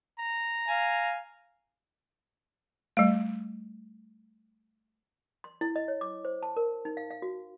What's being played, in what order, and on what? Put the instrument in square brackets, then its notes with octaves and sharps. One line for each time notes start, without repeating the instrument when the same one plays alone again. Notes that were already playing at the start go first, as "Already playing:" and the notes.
[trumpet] A#5
[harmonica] F5 G#5
[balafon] G3 A3
[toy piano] C6
E4
D#5
C#5
D6
C5
A5
A#4
D#4
F5
F5
F#4